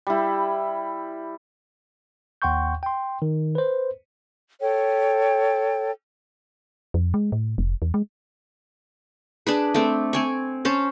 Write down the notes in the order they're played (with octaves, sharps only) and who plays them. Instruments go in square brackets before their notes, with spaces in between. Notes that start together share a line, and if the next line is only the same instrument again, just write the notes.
[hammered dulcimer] G3 E4
[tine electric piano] D#2 F#5 G5 C6 C#6 G6
G5 C6
D#3
B4 C5
[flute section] A4 C#5 G5
[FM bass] F2
G#3
A2
F1
E2
G#3
[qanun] D4 G#4 B4
A3 C4
C4 G#5 C#6
C#4 C5 A5